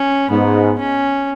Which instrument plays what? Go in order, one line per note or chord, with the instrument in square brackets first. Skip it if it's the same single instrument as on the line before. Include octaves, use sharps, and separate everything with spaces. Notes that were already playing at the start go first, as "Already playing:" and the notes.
Already playing: [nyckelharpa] C#4
[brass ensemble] G#2 [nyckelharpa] B3
[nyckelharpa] C#4